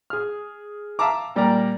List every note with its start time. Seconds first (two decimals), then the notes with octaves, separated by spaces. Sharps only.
0.10 G#4 F6
0.99 E5 F5 A5 A#5 D6
1.36 A#2 G3 G4 A#4 D5 A#5